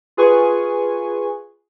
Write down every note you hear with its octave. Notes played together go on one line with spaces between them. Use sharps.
F4 G#4 B4 G#5 C#6